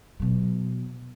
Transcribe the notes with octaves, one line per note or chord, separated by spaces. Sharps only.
B2 F#3